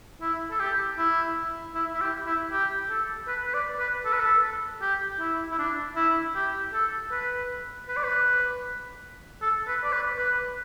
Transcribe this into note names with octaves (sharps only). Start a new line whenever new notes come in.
E4
A4
G4
E4
E4
E4
G4
E4
G4
A4
B4
B4
D5
B4
A4
B4
A4
G4
E4
E4
D4
E4
G4
A4
B4
B4
D5
B4
A4
B4
D5
B4
B4